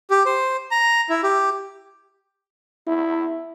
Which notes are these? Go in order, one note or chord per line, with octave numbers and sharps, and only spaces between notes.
G4
C5
A#5
E4
G4
E4